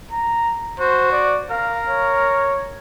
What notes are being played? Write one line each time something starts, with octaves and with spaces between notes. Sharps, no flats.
A#5
F#4 C5
D5
A#4 F5
C#5